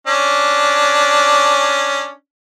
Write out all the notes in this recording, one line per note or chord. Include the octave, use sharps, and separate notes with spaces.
C#4 D4